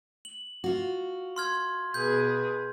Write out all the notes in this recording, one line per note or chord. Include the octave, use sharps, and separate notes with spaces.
F#7
F4 F#4
C6 F6 G#6
B2 G#4 B4 G6